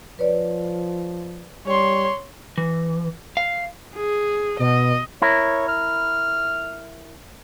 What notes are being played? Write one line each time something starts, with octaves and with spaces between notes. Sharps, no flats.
F3 B4 C#5 D5
G3 C#5 C6
E3
F5
G#4
B2 D#5
E4 A#4 C#5
F6